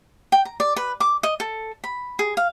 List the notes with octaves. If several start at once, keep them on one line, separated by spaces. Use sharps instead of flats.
G5
A#5
D5
B4
D6
D#5
A4
B5
G#4
F5